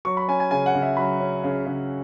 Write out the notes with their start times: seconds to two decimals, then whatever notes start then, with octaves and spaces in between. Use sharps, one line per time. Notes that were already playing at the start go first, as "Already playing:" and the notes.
0.05 F#3 C#6
0.17 B5
0.28 C#4 G#5
0.40 G#5
0.51 C#3 G#5
0.66 F#5
0.75 C#3
0.82 E5
0.97 F#3 B5
1.20 C#4
1.44 C#3
1.66 C#3